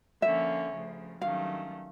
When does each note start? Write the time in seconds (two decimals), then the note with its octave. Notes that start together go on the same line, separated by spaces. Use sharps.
0.22 D3 F3 A#3 C#4 E5
0.72 D2 C#3 F3
1.21 G2 D#3 F#3 A3 C#4 F5